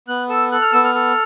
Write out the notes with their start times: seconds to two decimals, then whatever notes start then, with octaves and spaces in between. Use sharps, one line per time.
0.08 B3 F#6
0.29 A4 E6
0.52 A4 F#6
0.62 F6
0.72 B3 E6
0.84 F6
0.95 A4